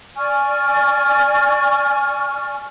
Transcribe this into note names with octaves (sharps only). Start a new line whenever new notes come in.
D5 G#5 C#6 F6